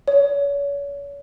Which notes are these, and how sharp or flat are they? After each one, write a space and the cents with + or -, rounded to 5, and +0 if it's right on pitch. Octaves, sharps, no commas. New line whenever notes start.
C#5 +35